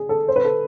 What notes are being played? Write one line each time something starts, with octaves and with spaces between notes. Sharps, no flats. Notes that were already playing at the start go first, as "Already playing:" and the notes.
Already playing: G#4
A4
C5
B4
A4